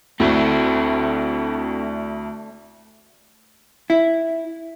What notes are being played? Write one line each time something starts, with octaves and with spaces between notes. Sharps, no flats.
D2 A3 C4 D4 E4 F#4
E4